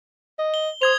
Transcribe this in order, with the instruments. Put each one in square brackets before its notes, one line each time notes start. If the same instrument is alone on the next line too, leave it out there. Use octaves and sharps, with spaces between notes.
[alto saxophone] D#5
[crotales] G7
[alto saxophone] C5 [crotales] D#6 G#6 F7